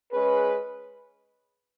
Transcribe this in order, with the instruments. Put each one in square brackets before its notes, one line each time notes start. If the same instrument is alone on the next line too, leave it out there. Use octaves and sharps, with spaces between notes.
[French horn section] G#3 C#4 G#4 B4